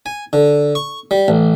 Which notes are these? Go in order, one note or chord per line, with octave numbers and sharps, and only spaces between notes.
G#5
D3
C#6
G3
A1